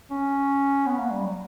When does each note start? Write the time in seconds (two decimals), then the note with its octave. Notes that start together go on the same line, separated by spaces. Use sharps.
0.11 C#4
0.87 B3
0.99 A#3
1.11 G3
1.24 F#3